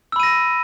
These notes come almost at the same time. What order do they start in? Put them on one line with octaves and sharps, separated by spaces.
E6 B5 D#7 A#6